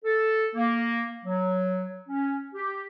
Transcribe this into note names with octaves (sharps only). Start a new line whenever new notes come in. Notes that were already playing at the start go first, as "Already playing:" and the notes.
A4
A#3
F#3
C#4
G4